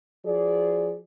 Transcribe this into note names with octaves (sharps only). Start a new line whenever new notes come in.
F3 F#4 G#4 D5